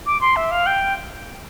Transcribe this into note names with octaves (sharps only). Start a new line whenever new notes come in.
D6
C6
E5
F5
G5